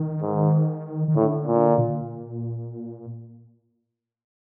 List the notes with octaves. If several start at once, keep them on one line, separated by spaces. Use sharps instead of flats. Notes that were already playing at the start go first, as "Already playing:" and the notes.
Already playing: D#3
G#2
D#3
A2 D3
A#2
A#2